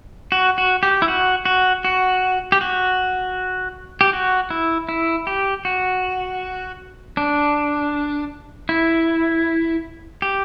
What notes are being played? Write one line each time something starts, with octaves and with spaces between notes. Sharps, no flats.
F#4
F#4
G4
E4
F#4
F#4
F#4
G4
F#4
G4
F#4
E4
E4
G4
F#4
D4
E4
G4